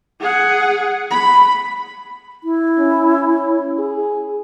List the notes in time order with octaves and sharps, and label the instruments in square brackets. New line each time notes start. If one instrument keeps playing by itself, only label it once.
[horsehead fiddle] G#4 F#5
B5
[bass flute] E4
[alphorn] C#4
G#4